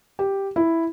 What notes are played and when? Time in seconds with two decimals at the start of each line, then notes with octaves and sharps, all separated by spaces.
0.19 G4
0.56 E4